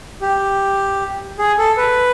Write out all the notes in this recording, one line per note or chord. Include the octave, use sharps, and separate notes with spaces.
G4
G#4
A4
B4